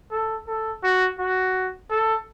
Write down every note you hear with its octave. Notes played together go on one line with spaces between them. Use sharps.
A4
A4
F#4
F#4
A4